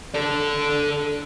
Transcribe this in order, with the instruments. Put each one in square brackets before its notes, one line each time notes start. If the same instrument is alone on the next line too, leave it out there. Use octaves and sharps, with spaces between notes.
[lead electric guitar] A4 D5